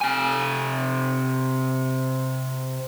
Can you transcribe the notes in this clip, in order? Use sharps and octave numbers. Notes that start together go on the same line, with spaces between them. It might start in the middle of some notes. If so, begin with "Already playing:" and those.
C3 G#5